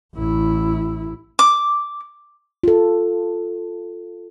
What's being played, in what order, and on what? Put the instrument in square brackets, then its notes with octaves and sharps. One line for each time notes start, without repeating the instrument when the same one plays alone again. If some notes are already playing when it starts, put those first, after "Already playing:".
[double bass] A1 E4
[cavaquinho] D6
[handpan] F4 A4